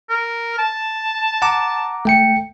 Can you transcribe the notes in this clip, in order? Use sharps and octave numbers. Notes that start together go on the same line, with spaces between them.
A#4
A5
F#5 A#5 D6
A3 G5 C#7